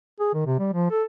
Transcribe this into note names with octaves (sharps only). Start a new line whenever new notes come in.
G#4
D#3
C3
G3
F3
A4